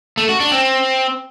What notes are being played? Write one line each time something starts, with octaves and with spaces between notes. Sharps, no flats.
A3
F#4
D4
C4